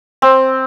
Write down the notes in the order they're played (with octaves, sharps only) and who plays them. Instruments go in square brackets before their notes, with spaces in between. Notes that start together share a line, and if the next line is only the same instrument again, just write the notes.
[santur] C4